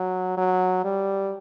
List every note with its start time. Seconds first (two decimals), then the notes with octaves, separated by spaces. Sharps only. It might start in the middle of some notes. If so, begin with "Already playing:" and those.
Already playing: F#3
0.37 F#3
0.84 G3